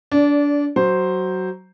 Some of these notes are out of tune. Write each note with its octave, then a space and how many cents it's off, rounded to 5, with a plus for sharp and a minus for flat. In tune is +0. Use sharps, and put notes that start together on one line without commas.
D4 -25 D5 -10
F#3 +15 C5 +0